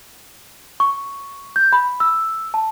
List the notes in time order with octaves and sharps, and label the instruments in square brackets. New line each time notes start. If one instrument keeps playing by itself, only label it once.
[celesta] C#6
G6
B5
E6
A5